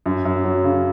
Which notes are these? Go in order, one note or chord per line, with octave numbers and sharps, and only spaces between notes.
F#2
F#2
F#3
C#3